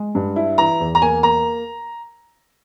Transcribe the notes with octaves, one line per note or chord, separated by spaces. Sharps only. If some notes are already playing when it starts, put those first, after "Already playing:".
Already playing: G#3
G2
E4
E3 A#5
E2
A#5
A#3 G#5
A#3 A#5